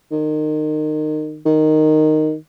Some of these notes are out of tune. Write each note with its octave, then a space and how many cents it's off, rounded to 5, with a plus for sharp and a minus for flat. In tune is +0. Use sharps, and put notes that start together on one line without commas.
D#3 -25
D#3 -10